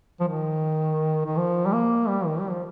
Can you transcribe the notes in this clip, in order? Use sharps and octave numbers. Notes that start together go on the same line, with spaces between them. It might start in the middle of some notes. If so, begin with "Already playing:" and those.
F3
D#3
D#3
F3
G3
A#3
G3
D#3
G3
F3